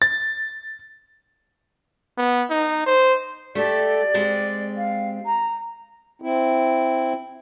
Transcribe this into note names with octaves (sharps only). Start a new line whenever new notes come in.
A6
B3
D#4
C5
A3 G4 A4 D5
G#3 C4 G4
F5
A#5
C4 E4